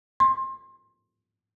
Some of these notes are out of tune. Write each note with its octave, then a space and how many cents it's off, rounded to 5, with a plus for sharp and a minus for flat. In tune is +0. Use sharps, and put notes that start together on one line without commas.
C6 +25